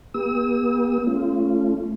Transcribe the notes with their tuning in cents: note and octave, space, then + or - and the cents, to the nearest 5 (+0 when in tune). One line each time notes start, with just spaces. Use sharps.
B3 -45 G4 +35 E6 -45
A3 -20 C#4 -10 F4 -25